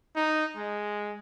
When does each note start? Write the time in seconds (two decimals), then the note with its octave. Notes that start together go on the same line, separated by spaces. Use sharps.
0.16 D#4
0.56 G#3